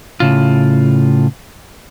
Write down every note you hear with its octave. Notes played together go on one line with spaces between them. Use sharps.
A2 C#3 F4